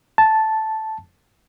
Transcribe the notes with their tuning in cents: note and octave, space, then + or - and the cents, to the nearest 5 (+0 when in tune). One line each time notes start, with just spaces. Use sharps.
A5 -5